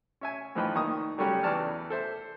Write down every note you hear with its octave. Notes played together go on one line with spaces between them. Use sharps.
C#4 E5 G#5
A2 E3 F3 D#4 B4 G5
A#2 D#3 C#6 D#6
F#3 G3 A3 C#4 F#4 G4
E2 E3 D5 A5 F6
A4 C5 E5